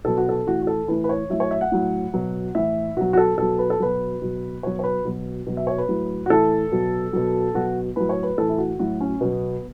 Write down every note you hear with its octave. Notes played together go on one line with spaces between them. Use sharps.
B2 F#3 A4
F#4
A4
A2 E3 F#4
F#4
A4
A2 E3 B4
B4
C#5
A2 F#3 E5
C#5
E5
F#5
A2 F#3
B2 F#3
A2 E3 E5
B2 F#3 F#4
F#4
A4
B2 F#3 A4
B4
A4
B2 F#3 B4
B2 F#3
B2 F#3 C#5
C#5
B4
B2 F#3
B2 F#3
E5
C#5
B4
A2 F#3
F#4
A2 E3 A4
B2 F#3
B2 F#3
B2 F#3 F#4
A2 F#3 B4
C#5
B4
A2 E3 A4
E4
F#4
A2 F#3 F#4
C#4
B2 F#3 B3